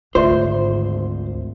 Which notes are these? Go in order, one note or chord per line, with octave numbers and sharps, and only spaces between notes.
G#1 D2 F4 C5 D5 E5